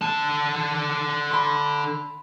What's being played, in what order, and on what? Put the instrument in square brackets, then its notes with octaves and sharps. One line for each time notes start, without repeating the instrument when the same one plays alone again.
[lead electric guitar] D3 A5
[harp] B5 C6